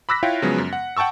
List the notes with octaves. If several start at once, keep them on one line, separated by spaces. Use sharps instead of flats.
B5 D6 E6 F#6 A#6 B6
E4 F4 C#5 F5 G5
C#3 F3 F#3 G#3 B3
F#2
F#5
F#5 G5 A5 C#6 E6